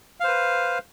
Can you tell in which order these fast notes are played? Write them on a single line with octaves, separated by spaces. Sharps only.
F5 C5 B4